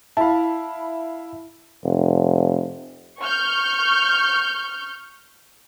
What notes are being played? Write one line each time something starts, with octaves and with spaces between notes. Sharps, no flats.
E4 F5 A5 B5
F1
C#6 F6 G6